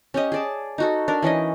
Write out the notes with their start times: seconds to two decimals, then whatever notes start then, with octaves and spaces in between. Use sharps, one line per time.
0.14 C#4 G4 D#5
0.32 G#4 D5 A5
0.78 D#4 F#4 A4
1.08 D4 A#4
1.23 E3 C#4 D#4 D#5